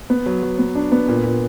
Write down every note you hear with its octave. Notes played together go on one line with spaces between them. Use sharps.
B3
F#3
F#3
B3
D4
B3
A#2
A#2